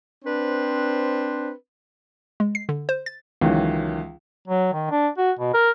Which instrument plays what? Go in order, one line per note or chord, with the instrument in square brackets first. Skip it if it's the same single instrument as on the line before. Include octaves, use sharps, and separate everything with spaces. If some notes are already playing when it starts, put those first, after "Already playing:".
[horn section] C4 D4 B4 C5
[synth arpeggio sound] G#3
C7
D3
C5
A6
[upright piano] C#2 D#3 E3 F#3
[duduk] F#3
D#3
D4
F#4
B2
A#4